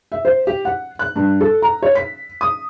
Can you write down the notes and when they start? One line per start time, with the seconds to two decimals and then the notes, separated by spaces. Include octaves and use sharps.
0.12 E5
0.25 C5
0.47 G4
0.65 F#5
0.99 F#6
1.16 G2
1.41 A4
1.62 A#5
1.83 C#5
1.95 B6
2.41 D#6